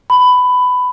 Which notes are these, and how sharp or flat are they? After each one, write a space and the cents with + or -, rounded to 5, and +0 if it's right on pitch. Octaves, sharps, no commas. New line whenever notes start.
B5 +15